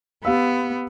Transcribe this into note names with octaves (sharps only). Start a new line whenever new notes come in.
B3 G4 F5 E6